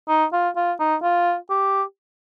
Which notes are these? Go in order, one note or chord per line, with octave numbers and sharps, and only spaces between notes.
D#4
F4
F4
D#4
F4
G4